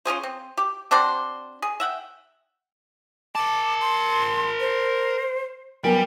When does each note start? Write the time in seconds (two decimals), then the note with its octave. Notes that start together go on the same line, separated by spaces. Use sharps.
0.05 C#4 F4 G#4 C5
0.23 C4
0.58 G4
0.91 C4 D4 F#4 C5
1.62 G#4
1.80 E5 F#5 G5
3.35 A#4 A5 D6
3.81 C6
4.60 C5
5.84 F#3 G3 B3 A#4 G#5